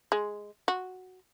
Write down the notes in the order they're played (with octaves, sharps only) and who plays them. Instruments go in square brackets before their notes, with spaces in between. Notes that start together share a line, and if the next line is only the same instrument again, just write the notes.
[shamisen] G#3
F#4